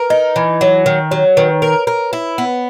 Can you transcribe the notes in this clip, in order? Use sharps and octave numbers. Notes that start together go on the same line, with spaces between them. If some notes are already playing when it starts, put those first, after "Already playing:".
Already playing: A#4 B4
D#4 D#5
E3
F#3
D#3
F#3 C#5
D#3 B4
A#4
A#4
E4
B3